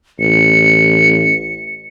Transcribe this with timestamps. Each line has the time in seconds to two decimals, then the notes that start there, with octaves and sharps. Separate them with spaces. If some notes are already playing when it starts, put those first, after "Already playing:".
0.20 A1 C#7